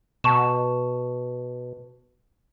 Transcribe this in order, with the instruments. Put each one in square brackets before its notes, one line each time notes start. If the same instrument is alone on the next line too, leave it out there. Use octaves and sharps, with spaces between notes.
[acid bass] B2 [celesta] A5 C#6 E7